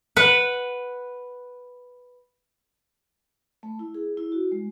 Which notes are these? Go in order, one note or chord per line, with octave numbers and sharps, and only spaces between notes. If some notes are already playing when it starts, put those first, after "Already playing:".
B4 F#5
A3
E4
G#4
E4
F#4
G#3